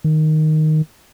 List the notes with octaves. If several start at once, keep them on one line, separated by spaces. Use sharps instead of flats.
D#3